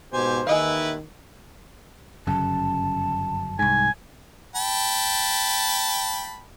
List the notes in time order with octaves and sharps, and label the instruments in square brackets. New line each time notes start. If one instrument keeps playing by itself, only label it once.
[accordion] G#2 C5 [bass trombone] B2 [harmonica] G4 G#5
[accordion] D#2 [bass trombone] D#3 [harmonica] E3 E4 B4 [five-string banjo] G#4 D#5 F5
[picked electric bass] G1 F#2 C#3 [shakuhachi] A5
[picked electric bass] C2 G#2 [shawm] G#5
[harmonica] G5 A5 B5